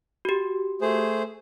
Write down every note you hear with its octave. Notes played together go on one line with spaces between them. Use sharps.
F#4 G4
A3 G#4 C5